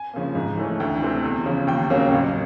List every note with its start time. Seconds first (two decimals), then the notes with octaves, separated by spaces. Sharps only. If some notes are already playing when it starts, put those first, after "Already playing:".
Already playing: G#5
0.14 C#3 F3 A#3
0.35 G#2
0.57 E3 A3 C#4
0.80 D2 G5
1.02 C3 E3 A3 C4
1.24 E2
1.46 C#3 F3
1.67 D#2 G5
1.90 C#3 F#3 A#3
2.12 A1